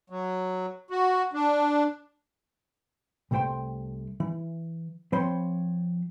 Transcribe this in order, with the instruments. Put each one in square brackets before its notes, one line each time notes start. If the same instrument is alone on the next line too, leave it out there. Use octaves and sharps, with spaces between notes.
[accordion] F#3
F#4
D4
[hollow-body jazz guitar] C2 C3 A3 C5 G5 C6
E3
F3 C4 C5 C#5 B5 C6